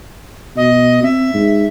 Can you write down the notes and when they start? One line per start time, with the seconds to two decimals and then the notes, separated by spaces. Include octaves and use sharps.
0.57 B2 D#5
1.03 C4 E5
1.34 G#2